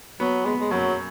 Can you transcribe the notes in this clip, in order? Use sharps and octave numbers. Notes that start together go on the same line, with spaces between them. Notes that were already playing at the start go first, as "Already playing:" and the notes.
F#3 B3
G#3 B3
G#3
F#2 F#3